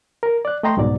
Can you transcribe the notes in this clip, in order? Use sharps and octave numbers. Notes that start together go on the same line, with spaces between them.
A#4
D5 F#6
A3 D#5 G5 A#5 C6
C2 G#2 B2 F#3 D5